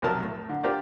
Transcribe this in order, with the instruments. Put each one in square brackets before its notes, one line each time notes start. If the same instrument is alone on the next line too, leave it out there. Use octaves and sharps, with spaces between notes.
[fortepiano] B1 F2 C3 F#3 A#4 A5
A2
D3
D4 F4 G4 A#4 C5 D5